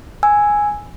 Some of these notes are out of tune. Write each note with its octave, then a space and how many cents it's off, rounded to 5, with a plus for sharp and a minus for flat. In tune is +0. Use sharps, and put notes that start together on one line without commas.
G#5 +0 E6 +0